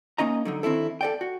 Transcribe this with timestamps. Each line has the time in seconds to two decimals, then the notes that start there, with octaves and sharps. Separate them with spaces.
0.18 A#3 C#4 D#4 D#5 A#5
0.45 D3 F#3 D#4
0.63 D#3 C4 D4 E4 A4
1.01 A4 D5 G5
1.21 F#4